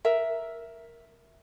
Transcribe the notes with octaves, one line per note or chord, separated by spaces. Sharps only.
A#4 E5